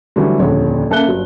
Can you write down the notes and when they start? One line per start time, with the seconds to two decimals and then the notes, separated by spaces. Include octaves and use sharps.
0.16 D3 E3 F#3 G3 A3
0.39 D#1 A#1 F2 D3 C#5
0.90 C#3 A#3 A4 E5 F#6 G7
1.07 G1 F#3